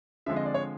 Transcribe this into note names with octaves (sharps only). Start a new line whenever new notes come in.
D3 F3 G#3 C4 E5
D#5
D5
C#5